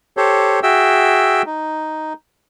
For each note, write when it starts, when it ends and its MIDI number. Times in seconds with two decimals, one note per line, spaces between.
0.17 0.60 67
0.17 0.60 69
0.17 0.60 72
0.17 0.60 73
0.63 1.42 66
0.63 1.42 68
0.63 1.42 76
0.63 1.42 79
0.63 1.42 88
1.46 2.13 63